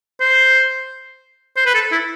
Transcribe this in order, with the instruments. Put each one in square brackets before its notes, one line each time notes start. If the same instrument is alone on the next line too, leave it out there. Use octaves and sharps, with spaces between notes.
[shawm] C5
C5
B4
A4
E4